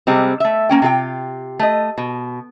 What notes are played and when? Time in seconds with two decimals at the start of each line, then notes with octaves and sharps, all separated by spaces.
0.07 C3 G3 G#3 C4
0.40 A3 E5
0.69 A#3 C#4 G5
0.82 C3 F4 G#4 G5
1.59 A3 D#5
1.98 B2